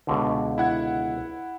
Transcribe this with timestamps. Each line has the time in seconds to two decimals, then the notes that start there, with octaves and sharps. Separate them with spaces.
0.07 C#2 B2 D3
0.58 E4 F#5 G#6